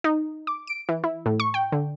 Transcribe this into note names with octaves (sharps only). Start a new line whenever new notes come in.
D#4
D6
D7
E3
E4
A2
C#6
G5
D3